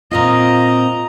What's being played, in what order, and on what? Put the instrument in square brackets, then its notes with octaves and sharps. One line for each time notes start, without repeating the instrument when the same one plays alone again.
[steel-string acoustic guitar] A#2 C4 F4 [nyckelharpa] D#5 A#5